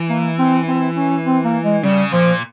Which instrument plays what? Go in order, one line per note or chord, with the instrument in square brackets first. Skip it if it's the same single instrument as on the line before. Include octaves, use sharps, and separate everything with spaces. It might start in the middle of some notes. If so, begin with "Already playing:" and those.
Already playing: [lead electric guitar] E3
[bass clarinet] A#3
C4
C4
C#4
C4
A#3
G#3
[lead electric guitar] C#3 [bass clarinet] G3
[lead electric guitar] A#2 [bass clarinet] F3